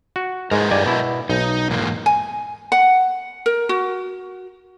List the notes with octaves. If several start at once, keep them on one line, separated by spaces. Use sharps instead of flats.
F#4
G#2 G#3 A#4 B4 D#5
G2 D5 G#5
B2 E4
B1 D#4
E2 G#2 A#3
G#5
F#5
A#4
F#4